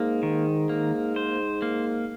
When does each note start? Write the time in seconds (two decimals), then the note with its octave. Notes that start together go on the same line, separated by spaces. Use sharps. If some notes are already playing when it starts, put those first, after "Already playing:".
Already playing: G#2 A#3
0.23 D#3
0.69 A#3
1.16 C5
1.62 A#3